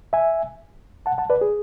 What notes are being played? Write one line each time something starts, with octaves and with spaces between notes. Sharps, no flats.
E5 G#5
F#5 A5
F#5 A5
B4 D5
G#4